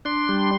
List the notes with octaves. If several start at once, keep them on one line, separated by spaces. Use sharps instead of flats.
D4 C6
G3